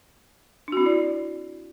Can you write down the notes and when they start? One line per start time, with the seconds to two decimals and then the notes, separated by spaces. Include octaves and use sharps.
0.68 D4
0.72 F#4
0.77 C4
0.81 E4
0.86 D5